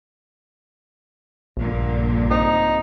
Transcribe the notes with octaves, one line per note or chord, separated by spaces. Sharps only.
A#1 G2 A#2 D3
C3 D#4